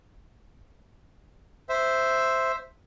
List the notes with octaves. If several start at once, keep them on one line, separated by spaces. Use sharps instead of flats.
C5 E5